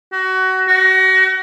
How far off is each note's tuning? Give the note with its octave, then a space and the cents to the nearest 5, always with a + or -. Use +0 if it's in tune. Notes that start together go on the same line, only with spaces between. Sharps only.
F#4 +25
F#4 +30